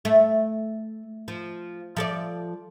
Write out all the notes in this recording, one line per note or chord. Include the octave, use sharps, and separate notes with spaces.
A3
F3
F3 A4 D5